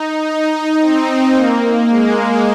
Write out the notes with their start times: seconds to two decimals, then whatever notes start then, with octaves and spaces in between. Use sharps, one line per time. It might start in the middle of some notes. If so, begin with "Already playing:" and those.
Already playing: D#4
0.25 D#4
0.80 C4
1.34 A#3
1.89 G#3